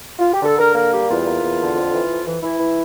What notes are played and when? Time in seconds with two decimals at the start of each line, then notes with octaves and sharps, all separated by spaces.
0.19 F4
0.33 G4
0.42 D3 A4
0.58 D3 A#4
0.75 A#3 A#4
0.92 G3 G4
1.09 E2 F4
1.26 A#3
1.42 E2
1.60 D3
1.76 F2
1.93 E3
2.09 F2
2.27 E3
2.43 E3 E4
2.60 E3